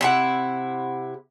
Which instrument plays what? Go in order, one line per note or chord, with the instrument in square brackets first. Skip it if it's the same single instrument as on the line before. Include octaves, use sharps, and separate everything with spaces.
[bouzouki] C3 E4 F#5